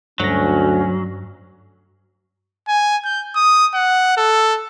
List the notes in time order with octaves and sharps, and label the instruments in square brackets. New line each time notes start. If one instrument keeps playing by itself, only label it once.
[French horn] D2 [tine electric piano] G2 A#6 [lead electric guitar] F#3 [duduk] C#4
[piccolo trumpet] G#5
G6
D#6
F#5
A4